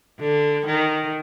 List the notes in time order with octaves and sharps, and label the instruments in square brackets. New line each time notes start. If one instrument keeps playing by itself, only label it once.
[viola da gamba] D3
D#3